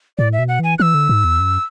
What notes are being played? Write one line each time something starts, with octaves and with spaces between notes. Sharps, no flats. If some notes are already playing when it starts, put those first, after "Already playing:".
A2 D5
E5
B2
F#5
E3 G#5
E3 E6 F#6
D3
G#2
E2
F#2